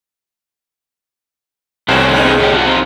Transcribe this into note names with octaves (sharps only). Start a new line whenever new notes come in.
C2 F#3 A3 C4 C#4 F#4
D3 G#3 D#4
C4 E4 B4
A2 C#4 G4
D4 F4 F#4
C4 D#4 F4